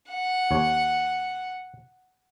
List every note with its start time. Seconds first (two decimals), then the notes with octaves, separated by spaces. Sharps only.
0.12 F#5
0.51 D#2 C#5